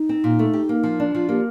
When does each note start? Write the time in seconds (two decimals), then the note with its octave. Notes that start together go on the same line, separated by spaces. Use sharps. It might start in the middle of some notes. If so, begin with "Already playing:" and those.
Already playing: D#4
0.09 C4
0.24 A#2
0.39 A3
0.53 G4
0.69 A#3
0.83 F3
1.00 D4
1.14 F3 F4
1.29 A#3 G4